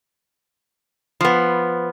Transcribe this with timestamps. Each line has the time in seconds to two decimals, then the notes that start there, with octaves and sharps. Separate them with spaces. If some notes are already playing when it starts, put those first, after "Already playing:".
1.21 F3 B3